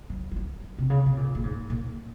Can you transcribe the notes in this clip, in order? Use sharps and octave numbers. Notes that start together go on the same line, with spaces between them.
F#3
F3
F#3
C3
C#3
C3
A#2
A#2
G#2
A#2